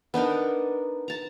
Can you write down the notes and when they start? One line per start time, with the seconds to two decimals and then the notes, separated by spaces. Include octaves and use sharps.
0.14 B3 D4 D#4 A#4
1.08 A5 A#5